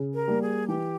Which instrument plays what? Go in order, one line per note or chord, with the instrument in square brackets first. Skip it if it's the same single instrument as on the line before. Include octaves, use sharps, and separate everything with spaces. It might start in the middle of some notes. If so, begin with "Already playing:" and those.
Already playing: [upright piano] C#3
[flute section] A#4
[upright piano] G3 A#3
[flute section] G#4
[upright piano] E3 [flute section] G4